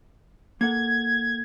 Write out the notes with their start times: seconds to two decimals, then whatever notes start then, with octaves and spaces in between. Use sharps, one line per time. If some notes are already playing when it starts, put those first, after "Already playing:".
0.61 A#3 A4 F#5 G#6